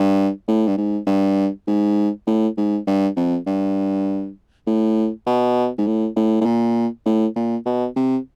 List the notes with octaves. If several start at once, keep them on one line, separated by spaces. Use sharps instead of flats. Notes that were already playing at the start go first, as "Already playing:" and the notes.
Already playing: G2
A2
G2
G#2
G2
G#2
A2
G#2
G2
F2
G2
A2
B2
G#2
A2
A2
A2
A#2
A2
A#2
B2
C3